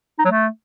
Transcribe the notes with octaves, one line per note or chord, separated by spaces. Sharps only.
D#4
F#3
A3